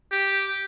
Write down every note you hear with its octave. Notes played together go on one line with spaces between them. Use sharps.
G4